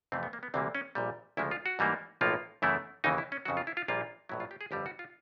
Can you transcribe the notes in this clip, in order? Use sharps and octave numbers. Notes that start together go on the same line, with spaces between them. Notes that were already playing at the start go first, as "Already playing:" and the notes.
F2 C3 E3 A3 C4
B3
A#3
B3
D2 C3 E3 G3 A#3 C4
C#4
A#1 A#2 G3
D2 C#3 F3 G#3 E4
F4
F#4
G#2 E3 G3 A#3
B1 A2 F3 A#3 F4
F#2 C#3 E3 A3 E4
D#2 C#3 E3 D#4
E4
C#4
F2 C#3 F#3 F#4
F4
E4
F4
A#1 A#2 G3 A#3 F4
A#1 A2 F#3 E4
F4
G4
G#4
G1 F2 D3 G3 G4
F#4
F4